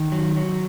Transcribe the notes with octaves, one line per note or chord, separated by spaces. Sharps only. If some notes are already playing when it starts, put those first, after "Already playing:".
Already playing: D#3
F#3
F#3